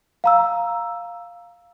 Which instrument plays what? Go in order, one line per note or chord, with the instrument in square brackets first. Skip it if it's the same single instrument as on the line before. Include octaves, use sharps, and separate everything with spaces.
[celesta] F5 A#5 E6